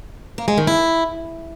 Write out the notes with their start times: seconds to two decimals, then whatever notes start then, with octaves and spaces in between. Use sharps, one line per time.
0.38 A#3
0.48 G#3
0.58 D#3
0.67 E4